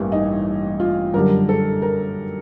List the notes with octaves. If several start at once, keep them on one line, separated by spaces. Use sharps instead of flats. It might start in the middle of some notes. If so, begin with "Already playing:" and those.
Already playing: A1 G2 E3 G3 A#3 E4
D#4
F4
F#2 D3 G3 A#4
A4
A#4